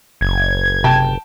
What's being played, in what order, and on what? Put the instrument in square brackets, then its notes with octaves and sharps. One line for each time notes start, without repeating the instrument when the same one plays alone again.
[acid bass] F#1 [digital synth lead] G#6
[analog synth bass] C3 [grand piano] G5 A5